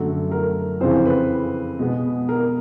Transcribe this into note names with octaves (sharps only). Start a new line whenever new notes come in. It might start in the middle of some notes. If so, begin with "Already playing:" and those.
Already playing: F#2 D3 F#3 A3
A#4
F2 C#3 E3 C5
B4
B2 G#3 B3
A#4